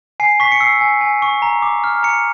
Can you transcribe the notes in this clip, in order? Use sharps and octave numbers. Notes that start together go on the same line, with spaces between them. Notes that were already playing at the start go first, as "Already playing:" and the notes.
G#5 C7
C#6 B6
C#7
E6 C7
G#5
G#5
C#6
A#5
D6
F6
A#5 C#7